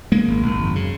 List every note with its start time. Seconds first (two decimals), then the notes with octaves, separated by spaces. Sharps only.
0.12 C#3 G#3 A#3
0.28 G#1
0.42 G#1
0.59 F#2
0.75 C#3